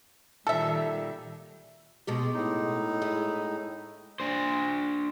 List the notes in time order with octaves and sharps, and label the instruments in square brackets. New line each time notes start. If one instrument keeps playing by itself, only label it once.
[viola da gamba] A#2 D#3 G3 [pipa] A4 E5
[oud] B2 G#3 G4
[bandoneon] A2 D#4
[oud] G#3 E4
[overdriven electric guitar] D4 C5